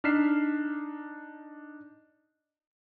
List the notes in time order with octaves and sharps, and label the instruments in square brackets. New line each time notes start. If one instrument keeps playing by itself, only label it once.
[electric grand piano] D4 D#4 F6 B6 C7 E7